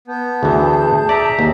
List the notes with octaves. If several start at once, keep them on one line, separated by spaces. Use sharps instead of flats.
B3 A5 G6
D2 E3 G#4
D5 E5 A#5
D#2 A#3